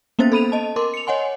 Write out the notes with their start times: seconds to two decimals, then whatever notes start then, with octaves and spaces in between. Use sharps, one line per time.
0.19 A#3 B3 C#4 C5 A6
0.32 A4 B5 D#7 F7
0.52 D#5 A5
0.76 A#4 C6 D6
0.94 C#7 F7
1.07 C#5 D#5 F#5 G#5 C6